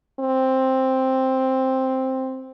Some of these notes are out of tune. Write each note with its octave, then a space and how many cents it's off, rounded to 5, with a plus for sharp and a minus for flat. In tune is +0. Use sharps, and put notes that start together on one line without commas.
C4 +5